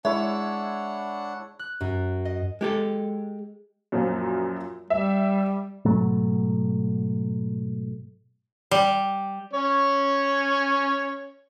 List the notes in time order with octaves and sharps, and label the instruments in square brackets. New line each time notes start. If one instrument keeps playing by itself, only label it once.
[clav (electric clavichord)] G#3 [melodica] D4 F#5 [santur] E4 C#5 [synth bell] E5
[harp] F#6
F#2
D#5
[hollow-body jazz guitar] G#3 G4 A4
[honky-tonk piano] F#2 A#2 F3
[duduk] G3 [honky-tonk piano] E5
[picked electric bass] G#2 B2 F#3 A3
[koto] G3
[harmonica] C#4 C#5